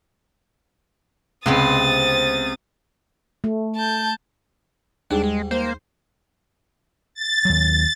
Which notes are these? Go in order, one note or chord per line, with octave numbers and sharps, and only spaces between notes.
C#2 C3 G#3 B3 C4 D#6 A6
A3
A5 G6
D#2 G#2 G3 D4 G#4
G#3
A#3 C5
A6
D#2 F#3